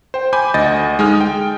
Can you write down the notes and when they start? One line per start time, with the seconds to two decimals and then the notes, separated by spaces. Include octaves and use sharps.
0.14 C5 G5
0.33 G#5 B5 D6 G6
0.54 D2 D#5 A6
0.99 G#3 D#4 G#5 D#6 F6
1.21 G5